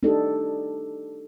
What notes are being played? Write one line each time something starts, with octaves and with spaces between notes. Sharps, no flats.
D4 D#4 G4 A4 D#5